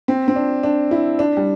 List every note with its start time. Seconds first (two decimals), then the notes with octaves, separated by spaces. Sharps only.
0.08 C4
0.28 C4
0.36 D4
0.63 D4
0.91 E4
1.19 D4
1.37 G3